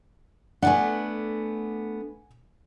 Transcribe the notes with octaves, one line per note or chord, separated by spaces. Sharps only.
A3 B3 D4 F#5 G#5